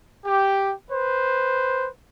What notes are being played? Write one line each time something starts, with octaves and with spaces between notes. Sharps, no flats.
G4
B4 C5